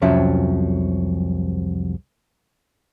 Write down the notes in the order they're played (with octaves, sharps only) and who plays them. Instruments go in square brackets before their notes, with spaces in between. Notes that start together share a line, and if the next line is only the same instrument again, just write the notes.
[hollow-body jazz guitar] C2 F2 F3 F#3 C#4 E5